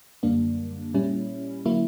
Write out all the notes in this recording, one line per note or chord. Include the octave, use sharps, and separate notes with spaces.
F#2 D3 G3 A#3 D4
A#2 G3 C#4 E4
D3 F#3 A#3 E4